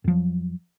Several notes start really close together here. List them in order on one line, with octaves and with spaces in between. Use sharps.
F2 F3 F#3